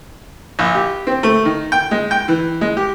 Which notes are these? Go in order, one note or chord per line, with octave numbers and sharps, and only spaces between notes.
A#1
G4
C4
A3
D#3
G5
G#3
G5
E3
G#3
G4